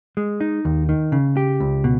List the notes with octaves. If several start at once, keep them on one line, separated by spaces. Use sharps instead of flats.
G#3
D#4
D#2
D#3
C#3
G4
C#2
B2